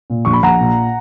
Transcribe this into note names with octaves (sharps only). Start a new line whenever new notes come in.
A#2
A#1 C#6
B5
A#1 F#5 A#5
A#2